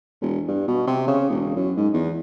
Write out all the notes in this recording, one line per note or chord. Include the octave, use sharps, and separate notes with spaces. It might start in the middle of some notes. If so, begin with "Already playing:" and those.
E1
G2
B2
C3
C#3
E1
F#2
G#2
E2